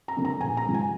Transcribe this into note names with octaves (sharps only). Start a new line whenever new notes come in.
A#5
F2 D3 F3 A#3
A#5
A#1 G#5
A#5
G#2 F3
G#5